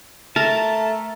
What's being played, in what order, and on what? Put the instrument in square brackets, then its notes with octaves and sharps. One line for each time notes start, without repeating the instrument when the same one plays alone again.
[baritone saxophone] A3 [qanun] A#4 [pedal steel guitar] A5